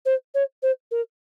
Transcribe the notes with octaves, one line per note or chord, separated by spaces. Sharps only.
C5
C#5
C5
A#4